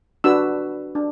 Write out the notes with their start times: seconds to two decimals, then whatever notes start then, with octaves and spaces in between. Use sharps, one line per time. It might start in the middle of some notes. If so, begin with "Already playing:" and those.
0.24 D4 F#4 B4 E6
0.95 D4